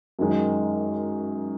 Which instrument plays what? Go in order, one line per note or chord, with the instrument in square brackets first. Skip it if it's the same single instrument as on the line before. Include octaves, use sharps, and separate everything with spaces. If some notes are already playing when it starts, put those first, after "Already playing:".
[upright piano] F#2 D#3 G#3